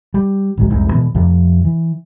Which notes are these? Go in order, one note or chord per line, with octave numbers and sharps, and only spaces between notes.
G3
G#1 C#2 G#2 F#3
F1 C2 G#2
B2 E3 B3
F2 C3 F3
E3